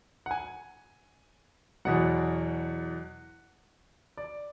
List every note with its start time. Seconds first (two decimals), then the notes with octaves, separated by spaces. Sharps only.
0.26 F#5
0.31 G#5
1.85 E2 B2 F#3 F#5
4.17 D5